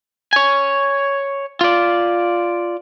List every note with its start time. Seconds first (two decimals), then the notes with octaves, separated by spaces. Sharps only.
0.33 C#5 G#5
1.61 F4 D5